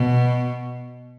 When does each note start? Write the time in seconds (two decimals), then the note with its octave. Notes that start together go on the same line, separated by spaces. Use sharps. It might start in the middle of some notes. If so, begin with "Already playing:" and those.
Already playing: B2